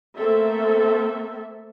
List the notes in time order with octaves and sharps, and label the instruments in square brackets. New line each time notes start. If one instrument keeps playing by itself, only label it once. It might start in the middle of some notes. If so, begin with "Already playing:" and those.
[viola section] A3 A#3 C4 A4 E5